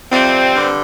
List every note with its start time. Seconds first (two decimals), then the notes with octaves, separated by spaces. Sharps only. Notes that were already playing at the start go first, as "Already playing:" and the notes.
0.11 F2 C3 G3 C4
0.55 G2 D3